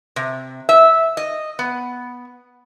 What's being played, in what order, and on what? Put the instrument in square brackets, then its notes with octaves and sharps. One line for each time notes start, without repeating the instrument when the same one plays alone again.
[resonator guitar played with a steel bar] C3
E5
D#5
B3